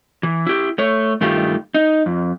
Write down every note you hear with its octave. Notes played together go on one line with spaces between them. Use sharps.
E3
E4 G4
A3 C#5
G2 D#3 A3 F4 G4
D#4
F2